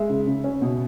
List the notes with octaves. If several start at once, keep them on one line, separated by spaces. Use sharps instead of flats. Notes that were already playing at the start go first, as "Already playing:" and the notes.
Already playing: G#3 E5
C#3
C#3
C#4
B2